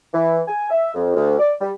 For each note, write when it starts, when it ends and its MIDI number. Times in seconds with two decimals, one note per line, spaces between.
0.13 0.41 52
0.47 0.70 80
0.70 0.91 76
0.94 1.14 41
1.15 1.36 38
1.39 1.53 74
1.61 1.70 55